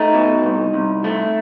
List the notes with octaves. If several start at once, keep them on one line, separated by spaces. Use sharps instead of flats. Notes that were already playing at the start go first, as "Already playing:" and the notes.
Already playing: A3 D#4
B2
C2
C2
A3